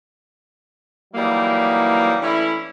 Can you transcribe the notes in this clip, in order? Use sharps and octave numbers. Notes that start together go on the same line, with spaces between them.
E3 F#3 G3 A#3 D#4 E4
E3 A3 C#4 D4 E4